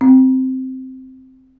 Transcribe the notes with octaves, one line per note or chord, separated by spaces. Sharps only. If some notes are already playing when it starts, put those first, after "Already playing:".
C4